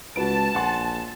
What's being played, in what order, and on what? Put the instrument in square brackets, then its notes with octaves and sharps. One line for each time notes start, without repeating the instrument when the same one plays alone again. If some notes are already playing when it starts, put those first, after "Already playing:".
[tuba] C#2 [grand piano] F#4 B4 D7 [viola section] A5
[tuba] A#1 [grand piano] F#5 G#5 C6